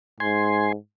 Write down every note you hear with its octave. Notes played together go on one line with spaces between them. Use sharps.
G#2 G#5 C6